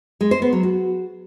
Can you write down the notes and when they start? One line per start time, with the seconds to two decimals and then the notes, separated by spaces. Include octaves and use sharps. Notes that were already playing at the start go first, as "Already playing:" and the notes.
0.21 G#3
0.31 C5
0.42 B3
0.53 F#3
0.63 F#4